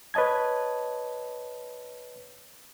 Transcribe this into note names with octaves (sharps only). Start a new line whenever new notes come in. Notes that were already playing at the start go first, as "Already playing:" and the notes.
B4 C#5 D#5 A5 G#6